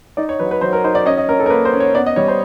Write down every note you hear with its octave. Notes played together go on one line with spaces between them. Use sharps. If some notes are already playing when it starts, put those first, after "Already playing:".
D#4 D5
C#5
F#3 B4
B4
F#3 C5
A#4
D#4 C5
D5
C#4 D#5
D#5
C#4 A#4
A4
A#4
A#3 B4
C5
C#4
C#5
B3 D5
D#5
G3 C#5
C5